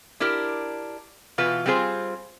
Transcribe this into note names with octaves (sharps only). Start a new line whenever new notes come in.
D4 E4 G4 A#4
B2 E3 F4 B4
G3 C4 F4 G#4 C5